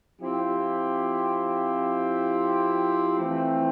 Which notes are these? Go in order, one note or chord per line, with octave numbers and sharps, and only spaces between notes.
F3 C4 E4 G4
E3 A3 C4